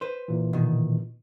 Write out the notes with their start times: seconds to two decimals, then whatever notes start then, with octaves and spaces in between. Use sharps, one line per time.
0.01 B4 C5
0.28 A#2 E3
0.53 B2 D#3